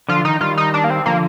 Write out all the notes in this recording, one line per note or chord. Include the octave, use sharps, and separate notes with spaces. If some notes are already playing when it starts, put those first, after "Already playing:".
D3 F3 F4
D#3 D#4
D#3 G3 F4
D#4
D4
A#3
C4
D3 F3 A#3